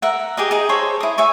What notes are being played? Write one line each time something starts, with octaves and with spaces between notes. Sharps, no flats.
A#4 E5 F#5
G4 G#4 D#5
D#4 G#4
G#4 A4 C5 C#5
E4 D#6
C#5 E5 G#5 C#6